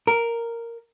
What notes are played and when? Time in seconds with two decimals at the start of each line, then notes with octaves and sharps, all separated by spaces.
0.07 A#4